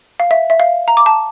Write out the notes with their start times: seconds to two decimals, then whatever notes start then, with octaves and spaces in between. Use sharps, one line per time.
0.20 F5
0.31 E5
0.50 E5
0.60 F5
0.88 A#5
0.97 D6
1.06 A5